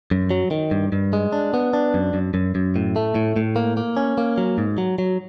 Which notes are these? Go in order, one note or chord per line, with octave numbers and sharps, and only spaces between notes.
F#2
F#3
D#3
G2
G2
G#3
D4
B3
D4
F#2
F#2
F#2
F#2
A2
A3
A2
A2
A#3
A#3
C#4
A#3
F#3
G#2
F#3
F#3